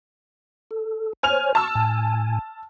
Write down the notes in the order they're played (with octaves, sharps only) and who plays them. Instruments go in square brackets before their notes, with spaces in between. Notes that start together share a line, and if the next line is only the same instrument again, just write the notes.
[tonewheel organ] A4
[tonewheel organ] C5 C#5 [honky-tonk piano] G#5 F6 F7
[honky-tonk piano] A5 E6 [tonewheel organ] C#6
[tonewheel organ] A2 G#5